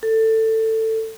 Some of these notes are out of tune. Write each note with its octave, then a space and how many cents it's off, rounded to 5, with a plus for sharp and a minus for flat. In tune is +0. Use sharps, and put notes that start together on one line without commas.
A4 +15